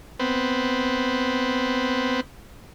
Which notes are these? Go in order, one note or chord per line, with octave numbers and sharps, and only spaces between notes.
B3 C4